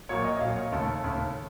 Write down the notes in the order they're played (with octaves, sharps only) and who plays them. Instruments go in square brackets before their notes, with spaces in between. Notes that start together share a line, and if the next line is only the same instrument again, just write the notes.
[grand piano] A#1 A#2 F#3 A#3 C#5
D#5
D#5
A#1 A#2 F#3 A#3 F5
C#5
D#2 C#3 A3 A4
D#2 C#3 A3